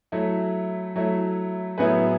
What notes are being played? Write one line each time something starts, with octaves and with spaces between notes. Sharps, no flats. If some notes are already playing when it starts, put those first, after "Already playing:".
F#3 A3 E4
F#3 A3 E4
A2 F#3 B3 E4 G#4 B4